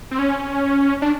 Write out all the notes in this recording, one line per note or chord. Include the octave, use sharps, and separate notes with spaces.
C4
C#4
D4